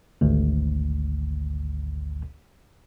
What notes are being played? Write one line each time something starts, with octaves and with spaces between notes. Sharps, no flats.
G#1 D2